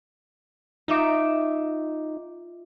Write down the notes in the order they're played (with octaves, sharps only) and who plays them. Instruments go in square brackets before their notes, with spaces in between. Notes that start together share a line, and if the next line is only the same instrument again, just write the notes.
[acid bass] D#4 [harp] F4 E5 D6